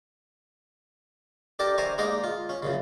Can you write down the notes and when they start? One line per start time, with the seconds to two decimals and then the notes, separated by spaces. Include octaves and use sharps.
1.59 D4 G4 A4 A#4 D5
1.78 C5 D5 E5 G#5 A#5 C#6
1.98 G#3 A#3 D#4 A#4 D5 F5
2.24 F4
2.49 C#4
2.63 F#2 A#2 C#3